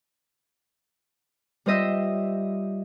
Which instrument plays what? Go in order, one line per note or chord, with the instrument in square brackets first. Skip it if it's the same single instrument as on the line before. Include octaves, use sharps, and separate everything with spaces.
[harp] G3 F4 C5 D#5 E5